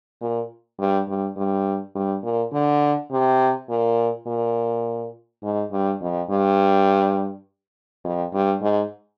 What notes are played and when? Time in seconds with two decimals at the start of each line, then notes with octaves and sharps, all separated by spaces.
0.21 A#2
0.79 G2
1.08 G2
1.37 G2
1.95 G2
2.23 A#2
2.53 D3
3.11 C3
3.69 A#2
4.27 A#2
5.43 G#2
5.72 G2
6.01 F2
6.30 G2
8.04 F2
8.33 G2
8.62 G#2